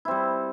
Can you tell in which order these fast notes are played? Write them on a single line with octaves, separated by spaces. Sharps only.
E4 C4 G3